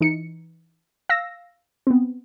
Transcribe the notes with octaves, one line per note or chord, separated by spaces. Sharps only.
E3 D#4 C#7
F5 E6 A#6
B3 C4